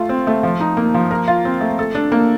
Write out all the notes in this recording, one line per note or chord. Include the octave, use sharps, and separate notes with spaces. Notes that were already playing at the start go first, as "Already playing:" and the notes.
Already playing: A3 F4
C4
A3
F3
D#4
A#3
F3
A#4
F4
C4
A3
A4
D4
A#3